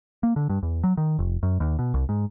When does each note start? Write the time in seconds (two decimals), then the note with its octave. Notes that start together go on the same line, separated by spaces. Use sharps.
0.23 A#3
0.36 D3
0.49 G2
0.63 E2
0.84 F#3
0.97 D#3
1.19 F1
1.43 F#2
1.60 D#2
1.79 B2
1.94 C2
2.09 G#2